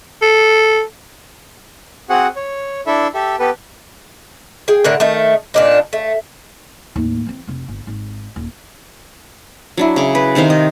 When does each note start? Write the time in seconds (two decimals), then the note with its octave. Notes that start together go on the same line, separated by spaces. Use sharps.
0.22 A4
2.10 C4 F#4 G#4 F#5
2.36 C#5
2.87 D4 E4 A4 E5
3.14 G4 A4 E5
3.39 B3 G4 A4 B4
4.68 G#4 G5
4.84 A2 D3 A#4 F#5
5.00 D#3 A3
5.54 A#2 D4 D#4
5.93 A3
6.96 D#2 A2
7.27 E3 C4
7.47 F1 C3
7.68 G1
7.87 G#1
8.36 D#1
9.77 F#3 D4 E4
9.96 C#3 D6
10.15 B4
10.35 C3 D#3 C4 F5
10.50 D#5